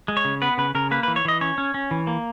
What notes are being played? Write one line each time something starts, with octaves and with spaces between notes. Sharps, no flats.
G#3
C#5
C#3
B3 B4
C#3 B4
C#3 A#4
A#3 B4
B4
E3
C#5
E3 D#5
C#4 C#5
C#4
C#4
E3
A#3